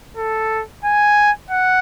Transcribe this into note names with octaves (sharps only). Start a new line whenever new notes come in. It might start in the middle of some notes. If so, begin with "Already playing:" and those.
A4
G#5
F#5